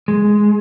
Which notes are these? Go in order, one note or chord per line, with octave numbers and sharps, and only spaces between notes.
G#3